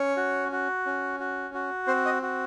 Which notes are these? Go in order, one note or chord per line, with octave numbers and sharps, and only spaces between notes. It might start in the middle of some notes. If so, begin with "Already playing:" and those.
Already playing: C#4 C#5
F#4
F#4
C#4
F#4
F#4
C4 C5
D#5
F#4